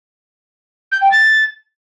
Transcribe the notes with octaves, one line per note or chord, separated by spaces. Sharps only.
G6
G5
A6